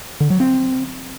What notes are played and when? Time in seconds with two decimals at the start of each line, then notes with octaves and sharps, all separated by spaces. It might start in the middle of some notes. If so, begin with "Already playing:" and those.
0.20 D3
0.30 F#3
0.40 C4